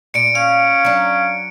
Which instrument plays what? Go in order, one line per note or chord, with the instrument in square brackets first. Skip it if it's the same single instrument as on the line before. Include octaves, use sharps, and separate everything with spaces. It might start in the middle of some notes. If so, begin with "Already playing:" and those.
[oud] A#2 D5 [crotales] C#7 D7
[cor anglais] C#4 [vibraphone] F5
[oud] F#3 D4